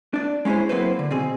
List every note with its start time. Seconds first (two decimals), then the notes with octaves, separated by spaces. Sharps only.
0.14 D4 D5
0.45 G#3 C#4 E4 G#4 C5
0.69 F#3 A#3 C4 E4 B4 C5
0.99 D3
1.11 B2 C4 G#4